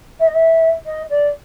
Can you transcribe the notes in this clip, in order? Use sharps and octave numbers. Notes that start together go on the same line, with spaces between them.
E5
D#5
E5
D#5
D5